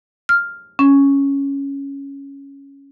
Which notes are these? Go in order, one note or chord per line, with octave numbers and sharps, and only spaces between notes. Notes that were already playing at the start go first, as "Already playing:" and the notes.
F6
C#4